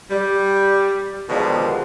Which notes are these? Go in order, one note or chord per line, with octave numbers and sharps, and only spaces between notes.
G3
B2 D3 D#3 F3 G3 G#3